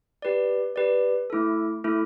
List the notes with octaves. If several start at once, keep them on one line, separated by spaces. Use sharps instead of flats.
G4 B4 D5
G4 B4 D5
A3 E4 A4
A3 E4 A4